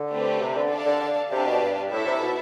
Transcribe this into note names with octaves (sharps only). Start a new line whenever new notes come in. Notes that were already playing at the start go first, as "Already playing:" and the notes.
Already playing: D3
A3 C4 G4 B4
C3
D3
D4 A4 D5 F5 A5
D3
D3
C3 D4 G4 B4 F5 A5
B2
G2
A2 E4 A4 E5
C3
B2